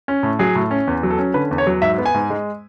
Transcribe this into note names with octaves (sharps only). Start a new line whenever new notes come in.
C#4
A2
F#3 G#4
A2
C#4
E2
F#3
A4
C#4
D3 B4
E2
C#5
F#3
G#2 E5
B3
G#5
G#2
G#3